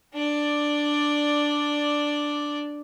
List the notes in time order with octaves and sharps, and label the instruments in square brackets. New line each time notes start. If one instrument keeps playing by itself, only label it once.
[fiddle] D4 D5